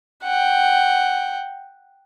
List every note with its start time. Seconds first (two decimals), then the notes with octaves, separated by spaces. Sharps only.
0.24 F#5 G5